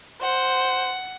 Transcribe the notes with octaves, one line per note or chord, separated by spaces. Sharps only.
C5 F#5